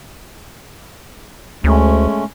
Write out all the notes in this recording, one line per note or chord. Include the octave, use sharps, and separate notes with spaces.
D2 G#3 A3 C#4